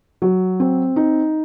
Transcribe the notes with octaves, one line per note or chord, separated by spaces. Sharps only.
F#3
C4
D#4